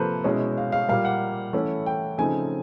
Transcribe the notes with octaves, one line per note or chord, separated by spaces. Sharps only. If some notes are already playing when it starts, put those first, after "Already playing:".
Already playing: C3 F3 A#3 A4 B4 C5
B2 G#3 C#4 E4
F5
F5
A#2 G3 A#3 F5
F#5
E3 A3 C#4 E4
G5
C#3 F3 A3 C4 D#4 G#5